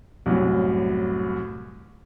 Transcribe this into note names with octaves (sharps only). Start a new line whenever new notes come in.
C2 F#2 A2